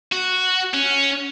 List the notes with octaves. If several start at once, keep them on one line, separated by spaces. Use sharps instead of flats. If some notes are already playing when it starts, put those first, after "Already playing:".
F#4
C#4